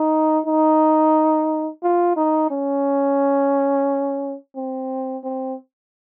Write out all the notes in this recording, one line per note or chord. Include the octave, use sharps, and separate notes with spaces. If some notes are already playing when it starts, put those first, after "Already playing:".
Already playing: D#4
D#4
F4
D#4
C#4
C4
C4